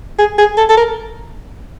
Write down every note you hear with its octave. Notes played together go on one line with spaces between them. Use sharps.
G#4
G#4
A4
A4
A#4